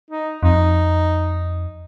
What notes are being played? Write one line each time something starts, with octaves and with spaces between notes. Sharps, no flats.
D#4
F2 D#4